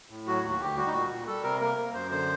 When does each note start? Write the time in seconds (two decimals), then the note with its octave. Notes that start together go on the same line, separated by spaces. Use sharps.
0.10 A2
0.27 F#3 F#4
0.43 D#2
0.50 F#4
0.60 D2 G4
0.77 G3 F#4
0.86 D#4
0.94 A#2 F#4
1.10 A#2
1.27 G3 A4
1.43 C3 A#4
1.60 A#3 A#4
1.77 A#3
1.94 F#2 C5
2.10 D3 C5